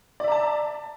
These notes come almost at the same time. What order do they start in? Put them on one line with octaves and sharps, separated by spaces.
D5 E5 A#5 A5